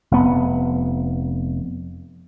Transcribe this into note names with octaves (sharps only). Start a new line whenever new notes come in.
F1 B3